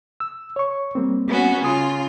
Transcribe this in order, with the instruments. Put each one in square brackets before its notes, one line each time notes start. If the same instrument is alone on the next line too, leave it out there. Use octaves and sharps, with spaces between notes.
[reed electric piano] E6
C#5 C#6
G3 A#3 C4
[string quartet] B3 C#4 F#4
[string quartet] C#3 F4 [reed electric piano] G#5 D#6